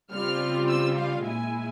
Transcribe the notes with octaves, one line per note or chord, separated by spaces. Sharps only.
C#3 G3 C4 F4 F6
E6
F5
A#2 G#3 E4 G#5